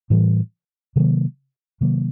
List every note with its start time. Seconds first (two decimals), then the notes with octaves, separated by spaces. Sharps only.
0.10 A2 E3 G3
0.96 C3 D#3 F#3 A#3
1.81 C3 D#3 F#3 A#3